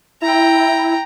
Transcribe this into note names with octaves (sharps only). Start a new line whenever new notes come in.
E4 G5 A#5